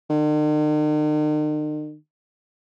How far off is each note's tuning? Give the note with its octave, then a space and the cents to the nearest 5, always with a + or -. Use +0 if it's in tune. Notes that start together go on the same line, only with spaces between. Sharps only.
D#3 -45